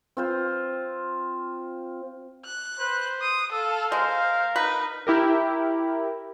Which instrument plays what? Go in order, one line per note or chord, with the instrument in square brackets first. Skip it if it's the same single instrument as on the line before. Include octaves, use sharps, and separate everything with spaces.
[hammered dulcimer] C4 F4 C5
[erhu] F#6
[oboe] B4 [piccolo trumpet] C5
[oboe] C6 [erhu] D#6
[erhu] A4 [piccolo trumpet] F5 [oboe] E6
[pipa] G#3 [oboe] A#4 [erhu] C5
[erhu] D#4 [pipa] B4
[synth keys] E4 G4 A#4